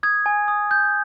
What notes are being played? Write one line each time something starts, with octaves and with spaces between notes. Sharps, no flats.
D#6 G#6
G#5
D#6
G6